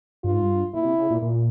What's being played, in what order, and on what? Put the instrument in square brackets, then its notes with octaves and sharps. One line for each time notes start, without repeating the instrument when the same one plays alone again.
[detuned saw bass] G2 [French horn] F4
[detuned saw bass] G#2
G2
[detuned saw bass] A#2 [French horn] E4
[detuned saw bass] C3
C#3
A#2
A#2